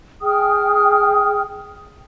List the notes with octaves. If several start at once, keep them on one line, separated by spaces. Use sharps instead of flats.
G#4 G5 D#6 F6